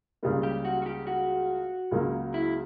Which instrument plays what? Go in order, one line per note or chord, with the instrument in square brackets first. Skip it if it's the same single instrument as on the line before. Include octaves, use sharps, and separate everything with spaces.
[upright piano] C#2 C#3 G3 A#3
[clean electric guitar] G4
F#4
F#4
G4
F#4
[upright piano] C#2 C#3 F#3 A#3
[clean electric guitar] E4